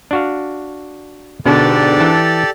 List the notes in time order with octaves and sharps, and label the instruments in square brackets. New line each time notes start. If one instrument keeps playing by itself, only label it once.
[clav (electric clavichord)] D4 F#4 F5
[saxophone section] G#2 B3 D4 [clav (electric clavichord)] B2 D3 [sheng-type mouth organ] G4 A4 D5
[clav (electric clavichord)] E3 A5